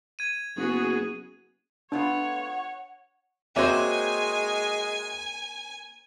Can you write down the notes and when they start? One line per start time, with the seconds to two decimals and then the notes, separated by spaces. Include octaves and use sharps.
0.19 G#6 D#7
0.57 F#1 B3 F#4 G#4
1.92 A3 B3 D4 F4 C#5 F#5
3.56 G#3 A#3 C4 F#4 C5 C#5 E5 G#5